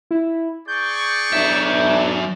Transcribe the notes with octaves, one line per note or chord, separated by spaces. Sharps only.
E4
G#4 D5 C#6 G6
B1 A2 F#3 D4 E5